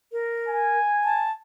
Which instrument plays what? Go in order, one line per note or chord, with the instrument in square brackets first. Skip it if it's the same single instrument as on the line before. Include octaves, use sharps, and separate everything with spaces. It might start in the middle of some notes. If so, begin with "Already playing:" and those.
[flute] A#4
[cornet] G#5
[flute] A5